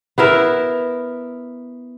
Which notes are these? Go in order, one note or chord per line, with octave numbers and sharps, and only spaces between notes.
B3 E4 A#4 E5